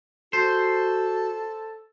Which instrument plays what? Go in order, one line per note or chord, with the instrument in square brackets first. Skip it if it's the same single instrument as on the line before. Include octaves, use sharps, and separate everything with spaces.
[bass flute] F#4 [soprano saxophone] A4 [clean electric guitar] C5